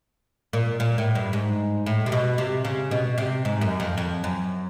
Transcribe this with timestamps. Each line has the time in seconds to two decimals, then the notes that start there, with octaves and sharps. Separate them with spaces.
0.53 A#2
0.80 A#2
0.98 A2
1.15 G2
1.33 G#2
1.86 A2
2.06 C3
2.12 B2
2.38 C3
2.65 C#3
2.91 B2
3.18 C3
3.45 G#2
3.61 F#2
3.80 F2
3.98 F2
4.24 F#2